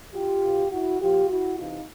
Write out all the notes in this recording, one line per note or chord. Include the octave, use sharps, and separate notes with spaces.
F4 G4
B2
E4 F#4
A#2 F3 F4 G4
E4 F#4
C3 E3 D#4 F4